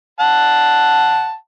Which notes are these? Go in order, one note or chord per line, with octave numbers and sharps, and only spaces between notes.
F#5 A5